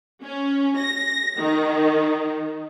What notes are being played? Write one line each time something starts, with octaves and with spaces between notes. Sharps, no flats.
C#4
A#6
D#3